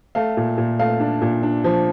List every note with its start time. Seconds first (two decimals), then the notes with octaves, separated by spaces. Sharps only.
0.15 A3 F5
0.37 A#2
0.58 A#2
0.79 A3 F5
1.00 D4
1.22 A#2
1.43 D4
1.64 F3